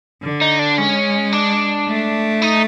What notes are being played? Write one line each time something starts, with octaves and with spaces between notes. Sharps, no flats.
D3
D#4
D4
G#3 C#4
D4
A3
D#4